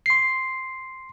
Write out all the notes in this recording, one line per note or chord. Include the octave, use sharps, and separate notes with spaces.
C6 C7